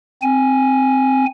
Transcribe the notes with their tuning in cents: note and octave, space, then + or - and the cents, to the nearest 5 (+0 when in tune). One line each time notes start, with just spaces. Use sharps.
C4 +0 G#5 +0